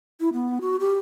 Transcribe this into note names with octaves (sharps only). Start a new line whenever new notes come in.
E4
B3
F#4
G4